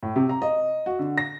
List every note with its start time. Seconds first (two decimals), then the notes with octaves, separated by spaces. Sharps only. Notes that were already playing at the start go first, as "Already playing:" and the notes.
0.03 A2
0.16 C3
0.29 A#5
0.42 D#5
0.86 F#4
0.99 D3
1.18 A#6